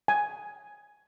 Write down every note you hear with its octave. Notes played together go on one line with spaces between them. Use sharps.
G#5